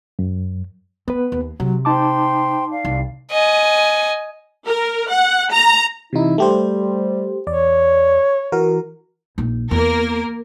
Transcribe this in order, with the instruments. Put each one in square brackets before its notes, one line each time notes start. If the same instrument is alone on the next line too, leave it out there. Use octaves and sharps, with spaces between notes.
[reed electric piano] F#2
[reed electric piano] B3 B4 [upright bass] C4
[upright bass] D#2
[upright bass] C3 [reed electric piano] F#3
[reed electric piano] D#4 A5 D6 [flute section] C5 G5 C6
[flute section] D5 F5
[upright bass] C2
[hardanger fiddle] D#5 G#5
[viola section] A#4
F#5
A#5
[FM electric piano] C3 E3 D#4 [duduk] E4
[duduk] G3 [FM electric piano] A3 G4 C5
[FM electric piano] E2 D5 [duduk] C#5
[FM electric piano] E3 F#4 A#4
[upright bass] A#1 D#4
[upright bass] E2 [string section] A#3 A#4